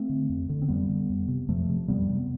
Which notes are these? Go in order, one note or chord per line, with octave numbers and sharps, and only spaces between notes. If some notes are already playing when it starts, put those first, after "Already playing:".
Already playing: A3 C4
D3
F2
D3
C4
F2 G3 B3
D3
F2
C3
F2 F3 A3
C3
F2 G3 B3
C3